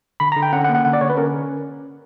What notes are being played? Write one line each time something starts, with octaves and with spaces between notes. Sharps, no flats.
D3 B5
A#5
D3
G5
C#4 F#5
F#5
A#3
F#5
D3 F#5
D5
D3 C#5
B4
C#4 A#4